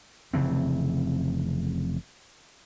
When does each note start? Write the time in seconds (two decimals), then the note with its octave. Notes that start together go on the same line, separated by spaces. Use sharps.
0.34 F1 C#3 E3 C4